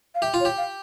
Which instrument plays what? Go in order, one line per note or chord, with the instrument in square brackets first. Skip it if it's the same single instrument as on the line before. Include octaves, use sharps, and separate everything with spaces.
[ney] F5
[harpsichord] G4 [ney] E5
[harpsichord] F4
[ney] C#5
[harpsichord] G4
[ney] F5